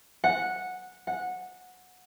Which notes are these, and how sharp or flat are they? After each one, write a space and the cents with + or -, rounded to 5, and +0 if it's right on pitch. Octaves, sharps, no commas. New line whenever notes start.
F#5 -10
F#5 -15